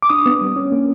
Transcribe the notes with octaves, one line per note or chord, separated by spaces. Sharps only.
D6
D4 D#6
B3
G3
C#4
A#3